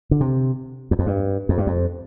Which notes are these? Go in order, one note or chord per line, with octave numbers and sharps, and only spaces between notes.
D3
C3
E2
F2
G2
F2
G2
F2